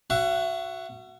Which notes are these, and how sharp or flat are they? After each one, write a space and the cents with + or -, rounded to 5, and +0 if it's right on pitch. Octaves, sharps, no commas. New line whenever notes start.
F#4 +0 E5 +40